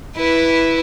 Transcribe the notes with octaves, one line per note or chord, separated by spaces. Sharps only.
E4 B4